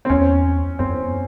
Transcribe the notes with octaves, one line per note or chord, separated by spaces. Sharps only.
C4
E2 C#4
F#2 C4